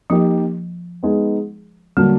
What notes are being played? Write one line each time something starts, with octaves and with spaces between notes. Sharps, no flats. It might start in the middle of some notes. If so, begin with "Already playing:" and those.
F3 A#3 D#4 G4
G#3 B3 D#4 G#4
D3 F#3 G3 A#3 D4